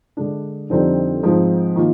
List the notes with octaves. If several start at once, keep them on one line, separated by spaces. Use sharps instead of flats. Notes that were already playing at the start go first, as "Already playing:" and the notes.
D3 G#3 D4
F2 D3 G3 C4 D#4
G#2 F3 G#3 C4 D#4
D#3 A#3 F4